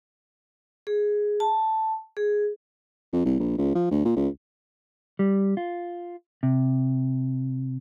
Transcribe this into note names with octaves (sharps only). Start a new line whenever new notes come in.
G#4
A5
G#4
F2
C2
A#1
C#2
F3
D2
A#2
C#2
G3
F4
C3